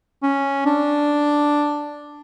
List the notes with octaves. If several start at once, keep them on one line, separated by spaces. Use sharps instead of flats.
C#4
D4